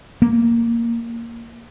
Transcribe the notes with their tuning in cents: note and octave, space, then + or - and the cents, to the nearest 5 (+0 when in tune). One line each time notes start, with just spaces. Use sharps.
A#3 -5